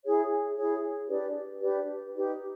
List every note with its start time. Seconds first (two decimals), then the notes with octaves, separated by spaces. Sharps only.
0.02 E4 G#4 C#5
0.56 E4 G#4 C#5
1.07 D4 G4 B4 D5
1.60 D4 G4 B4 D5
2.13 D#4 G4 B4